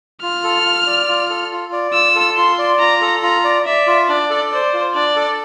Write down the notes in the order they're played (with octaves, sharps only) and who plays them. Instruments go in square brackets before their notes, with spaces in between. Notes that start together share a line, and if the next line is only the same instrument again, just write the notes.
[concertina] F4 [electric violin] F6
[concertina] A4
F4
D5
F4
A4
F4
D5
[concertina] F4 [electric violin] E6
[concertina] A4
[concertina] F4 [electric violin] C6
[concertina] D5
[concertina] F4 [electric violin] A#5
[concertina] A4
[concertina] F4 [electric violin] A#5
[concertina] D5
[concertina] D5 [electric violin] E5
[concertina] F4
[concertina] D4 [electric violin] D5
[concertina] A4
[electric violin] C5 [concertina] D5
[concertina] F4
[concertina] D4 [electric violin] D5
[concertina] A4